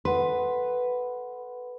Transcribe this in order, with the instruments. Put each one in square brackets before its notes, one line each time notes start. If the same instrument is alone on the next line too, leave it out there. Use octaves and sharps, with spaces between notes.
[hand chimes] A4 F#5 C6 [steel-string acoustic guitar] B4